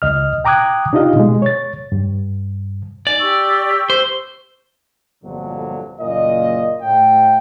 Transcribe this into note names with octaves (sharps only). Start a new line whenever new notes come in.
C#2 D#5 F6
G5 A#5 D6 D#6 F#6 G#6
D4 D#4 F4 G4 D#5 F5
B2 G#3
C#5 A6
G2
D#4 D5 G#5
G4 C#6 E6
C5
G1 F2 A#2 D3 F#3
F#1 A#2 D#5
A2 G5